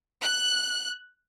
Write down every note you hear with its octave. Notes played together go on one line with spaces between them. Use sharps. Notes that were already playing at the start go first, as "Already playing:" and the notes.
F#6